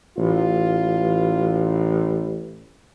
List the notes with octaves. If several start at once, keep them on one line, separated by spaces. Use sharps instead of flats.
A1 F4